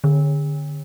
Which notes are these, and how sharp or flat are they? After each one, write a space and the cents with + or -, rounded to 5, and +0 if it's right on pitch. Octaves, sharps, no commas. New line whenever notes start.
D3 +10